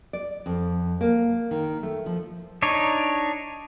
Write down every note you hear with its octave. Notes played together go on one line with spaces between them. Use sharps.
D5
F2
A#3
D#3
A3
F3
D4 D#4 C#5